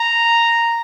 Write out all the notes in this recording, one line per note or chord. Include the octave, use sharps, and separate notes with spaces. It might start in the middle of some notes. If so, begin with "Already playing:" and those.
Already playing: A#5